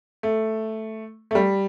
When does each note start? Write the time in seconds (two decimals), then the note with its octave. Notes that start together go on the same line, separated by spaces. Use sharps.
0.23 A3
1.31 A3
1.35 G3